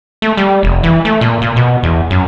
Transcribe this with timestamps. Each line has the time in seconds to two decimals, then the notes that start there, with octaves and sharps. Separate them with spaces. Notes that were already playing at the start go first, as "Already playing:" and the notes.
0.22 A3
0.37 G3
0.63 F1
0.83 E3
1.05 A3
1.21 A#2
1.42 A#2
1.56 B2
1.83 E2
2.10 F#2